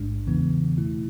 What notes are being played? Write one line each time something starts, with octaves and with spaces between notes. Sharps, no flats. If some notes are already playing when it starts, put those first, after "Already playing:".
Already playing: A1 G#2 G#3 D4
E2 C#3 E3 B3
B2 A3 E4